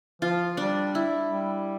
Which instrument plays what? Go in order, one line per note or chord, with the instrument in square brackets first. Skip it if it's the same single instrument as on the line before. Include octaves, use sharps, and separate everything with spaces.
[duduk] F3 [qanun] F4
[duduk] G3 [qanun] D4
[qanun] E4
[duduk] G3